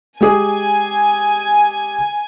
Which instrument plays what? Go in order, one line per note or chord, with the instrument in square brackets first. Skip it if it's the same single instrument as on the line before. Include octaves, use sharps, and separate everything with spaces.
[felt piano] G#3 G4 G#4 [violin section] G#5